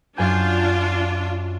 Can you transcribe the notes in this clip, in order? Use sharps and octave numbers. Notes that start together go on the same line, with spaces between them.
F#2 D4 F4 G#5 G6